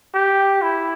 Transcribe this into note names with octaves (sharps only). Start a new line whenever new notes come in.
G4
E4